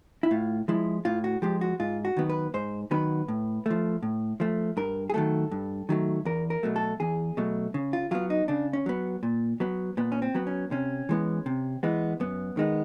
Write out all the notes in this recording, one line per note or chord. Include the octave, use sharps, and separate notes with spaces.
E4
A2 F4
F3 G#3 E4
A2 F4
F#4
F3 G#3 G4
F#4
G#2 F4
F#4
D#3 F#3 B3
B4
G#2 C5
D#3 F#3 B3 B4
A2
F3 A3
A2
F3 A3
G2 A#4
G#4
D#3 F#3 A3 A4
G2
D#3 F#3 A3
E2 A#4
A#4
B2 F#3 A3
A4
E2 G#4
B2 F#3 A3
C#3
F4
F#3 B3 F4
D#4
C#3 D4
C#4
F#3 B3
A#2
F#3 B3
A#2 B3
C#4
C4
F#3 B3
C#4
C3 C#4
E3 G#3 B3
C3
E3 G#3 B3
F#2 B3
D#3 G#3 B3